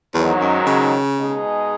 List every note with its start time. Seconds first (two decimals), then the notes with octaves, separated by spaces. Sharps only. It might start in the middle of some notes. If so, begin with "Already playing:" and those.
0.14 E2 G#2 D#3 F#3
0.41 F#2
0.67 C#3
1.18 B2 G#3 D#4 G#4